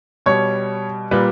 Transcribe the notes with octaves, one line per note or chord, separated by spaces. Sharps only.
B2 G3 C#5
A#2 G3 B4